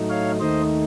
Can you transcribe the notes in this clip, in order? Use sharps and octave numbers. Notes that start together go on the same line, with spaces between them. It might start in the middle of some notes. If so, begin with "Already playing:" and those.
Already playing: A2 F#3 A3 D#4
C#5 F5
D#2 D#3 A3 D#4 C5 D#5